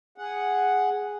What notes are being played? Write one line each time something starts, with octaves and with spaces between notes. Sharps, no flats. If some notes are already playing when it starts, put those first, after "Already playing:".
G#4 F#5